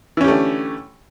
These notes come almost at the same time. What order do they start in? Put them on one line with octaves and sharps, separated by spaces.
E3 C#4 G4 A3 D3